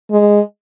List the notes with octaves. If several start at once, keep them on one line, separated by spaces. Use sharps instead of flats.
G#3